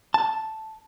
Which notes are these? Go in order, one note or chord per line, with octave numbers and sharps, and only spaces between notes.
A5